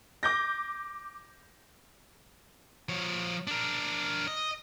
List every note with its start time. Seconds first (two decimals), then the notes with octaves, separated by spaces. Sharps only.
0.23 D6 G6 A#6
2.89 F3 C#5
3.47 D4 A#4
4.28 D#5